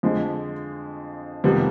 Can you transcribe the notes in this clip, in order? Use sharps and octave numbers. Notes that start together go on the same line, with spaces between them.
F2 D3 F3 G#3
F2 C3 D#3 G3 B3